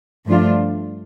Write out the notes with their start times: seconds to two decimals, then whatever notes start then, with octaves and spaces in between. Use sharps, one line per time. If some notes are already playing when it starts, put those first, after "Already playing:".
0.26 G2 F3 A3 D4 F4